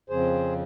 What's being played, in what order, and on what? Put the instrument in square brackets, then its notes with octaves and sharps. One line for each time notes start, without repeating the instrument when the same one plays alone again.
[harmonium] F2 C#3 F3 C4 G#4 C5